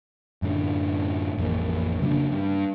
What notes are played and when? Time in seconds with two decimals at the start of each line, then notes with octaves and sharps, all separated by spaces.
0.42 F#2 A2 D3
1.38 A1 F2 A#3
2.02 C#3 F#3 A#3 D4
2.32 G2